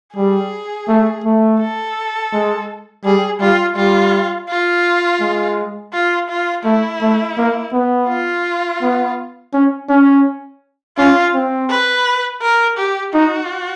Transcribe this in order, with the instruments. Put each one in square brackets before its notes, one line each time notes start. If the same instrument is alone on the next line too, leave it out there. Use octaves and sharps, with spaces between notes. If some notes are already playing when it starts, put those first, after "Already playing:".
[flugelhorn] G3 [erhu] G#4
[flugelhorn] A3
A3
[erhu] A4
[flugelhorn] G#3
[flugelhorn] G3 [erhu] G#4
[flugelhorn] G3 [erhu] F4
[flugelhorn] G3 [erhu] F4
[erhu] F4
[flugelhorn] G#3
[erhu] F4
F4
[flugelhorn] A3 [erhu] E4
[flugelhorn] A3
A#3
B3
[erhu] F4
[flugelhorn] B3
C#4
C#4
[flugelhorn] C#4 [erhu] F4
[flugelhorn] C4
[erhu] B4
A#4
G4
[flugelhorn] D#4 [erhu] F#4